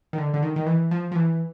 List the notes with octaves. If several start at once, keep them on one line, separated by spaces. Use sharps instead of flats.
D#3
D3
D3
D#3
D#3
E3
F3
F3
E3